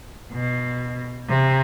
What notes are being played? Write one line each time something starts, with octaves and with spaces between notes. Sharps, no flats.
B2
C3